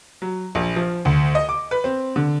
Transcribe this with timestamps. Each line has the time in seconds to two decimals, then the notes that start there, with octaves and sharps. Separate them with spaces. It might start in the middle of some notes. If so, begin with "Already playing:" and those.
0.22 F#3
0.55 A#1
0.76 F3
1.05 D2
1.35 D#5
1.49 D6
1.71 B4
1.84 C4
2.16 D3